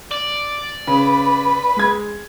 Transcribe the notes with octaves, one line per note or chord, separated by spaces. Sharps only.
D5
C#3 B4
G#3 G#6